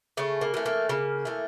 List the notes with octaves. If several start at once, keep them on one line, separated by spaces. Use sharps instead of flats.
C#3 A3
A#3
E3 A3
A#3
C#3 A#3
E3 A3